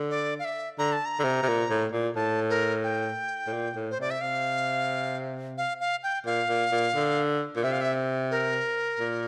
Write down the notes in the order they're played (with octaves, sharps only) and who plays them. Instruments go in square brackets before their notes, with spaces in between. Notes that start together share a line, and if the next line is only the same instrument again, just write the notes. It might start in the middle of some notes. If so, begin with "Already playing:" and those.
Already playing: [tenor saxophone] D3
[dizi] D5
F5
E5
[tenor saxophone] D3 [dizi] A#5
[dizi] A5
A#5
[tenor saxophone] D3
C3
C3
A#2
A2
A#2
[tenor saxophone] A2 [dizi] A5
[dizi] A#4
G5
[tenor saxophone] A2
A#2
A2
[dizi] C5
[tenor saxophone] C3 [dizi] D5
[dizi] E5
[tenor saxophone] C3 [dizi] F5
[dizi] F5
F5
G5
[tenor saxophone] A#2 [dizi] F5
[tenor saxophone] A#2
A#2
D3
A#2
[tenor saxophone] C3 [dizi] E5
[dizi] F5
E5
A#4
[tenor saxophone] A#2